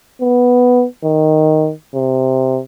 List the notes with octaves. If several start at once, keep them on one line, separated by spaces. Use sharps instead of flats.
B3
D#3
C3